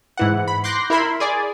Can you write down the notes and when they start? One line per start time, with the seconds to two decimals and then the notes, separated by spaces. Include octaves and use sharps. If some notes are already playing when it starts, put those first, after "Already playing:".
0.17 G#2 E3 F#5
0.48 B5
0.64 C6 D6 F#6 G6 A#6 C7
0.90 E4 A#4 E5 B5 C6
1.20 G#4 D5 G#5